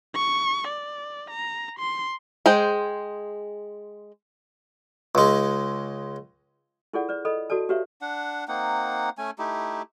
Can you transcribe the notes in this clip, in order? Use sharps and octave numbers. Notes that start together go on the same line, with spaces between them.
C#6
D5
A#5
C6
G#3 G#4 C5 G5
C#2 G#3
E4 F4 G#4 A4 D5 F#5
B4 D5
A4 D#5 B5 D#6
F#4 A4 D5 A5
F#4 G4 B4 C#5 E5 F5
D4 F#5
A#3 C4 D#4 F#5
A3 C#4 G#5
A3 D#4 E4 G4